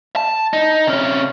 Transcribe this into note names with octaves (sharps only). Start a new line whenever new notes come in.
A5
D#4
C3 C#4